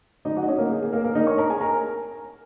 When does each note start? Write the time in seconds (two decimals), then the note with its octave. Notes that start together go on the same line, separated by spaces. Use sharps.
0.25 F#3 D#4 D#5
0.37 F#4 F#5
0.43 D#5
0.48 C#4 C#5
0.58 A#3 A#4
0.70 G#4
0.82 G#4
0.92 A#3 A#4
1.04 A#3 A#4
1.15 D#4 D#5
1.27 C#5 C#6
1.38 A#4 A#5
1.50 G#4 G#5
1.61 A#4 A#5